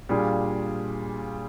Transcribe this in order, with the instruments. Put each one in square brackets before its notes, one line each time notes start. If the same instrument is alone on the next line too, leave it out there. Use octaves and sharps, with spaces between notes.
[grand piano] A#2 G3 D4 F4 G#4